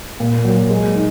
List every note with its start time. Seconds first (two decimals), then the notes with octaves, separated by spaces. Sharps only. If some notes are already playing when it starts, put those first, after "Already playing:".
0.20 A#2
0.44 F#3
0.50 A#3
0.70 G#3
0.95 D#4